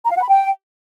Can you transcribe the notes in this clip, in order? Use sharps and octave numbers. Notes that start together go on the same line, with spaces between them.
A#5
F5
F#5
B5
G5